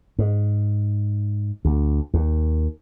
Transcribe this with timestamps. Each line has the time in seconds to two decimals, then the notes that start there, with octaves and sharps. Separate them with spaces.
0.19 G#2
1.65 D2
2.14 D#2